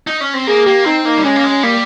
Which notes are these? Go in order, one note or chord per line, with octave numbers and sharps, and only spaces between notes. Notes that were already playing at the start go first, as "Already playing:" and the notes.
D#4
C#4
C4
A#3 G#4
A#3 G4
C4 D#4
A#3 D#4
G3
G#3 C#4
A#3
G#3
C#4
G3 A#3